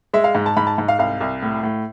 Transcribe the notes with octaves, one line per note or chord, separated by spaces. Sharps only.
G#3 E5
F5
G#2
A5
G#2 B5
A5
G#2
F5
C2 F5
C2
A2
A2